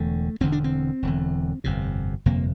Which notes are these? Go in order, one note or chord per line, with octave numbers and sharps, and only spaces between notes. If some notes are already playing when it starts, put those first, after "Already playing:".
Already playing: E1 E2 D3 A3
E1 E2 D3 C4
D4
C4
E1 E2 D3
G1 F2 C3
G1 F2 C3 A#3